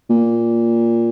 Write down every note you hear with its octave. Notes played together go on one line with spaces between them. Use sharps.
A#2